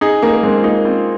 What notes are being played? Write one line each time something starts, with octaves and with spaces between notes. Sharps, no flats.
D#4 G#4
A#3 D#4
A#3
G#3 C4
F4
A#3 D#4
C4 F4